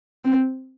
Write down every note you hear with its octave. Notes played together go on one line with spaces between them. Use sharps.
C4